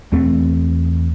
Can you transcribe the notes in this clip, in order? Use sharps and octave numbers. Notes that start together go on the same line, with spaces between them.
E2 A3 C4